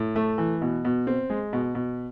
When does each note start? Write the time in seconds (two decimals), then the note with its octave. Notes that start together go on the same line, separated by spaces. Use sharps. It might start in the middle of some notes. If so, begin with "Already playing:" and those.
Already playing: A2
0.16 A3
0.38 E3
0.62 B2
0.85 B2
1.07 C4
1.30 G#3
1.53 B2
1.75 B2